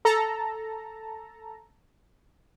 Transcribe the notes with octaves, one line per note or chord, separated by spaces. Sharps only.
A4 A5 A#5